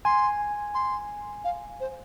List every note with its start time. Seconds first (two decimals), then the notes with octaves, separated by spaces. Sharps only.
0.05 G#5 C6
0.74 C6
1.44 F5
1.80 C5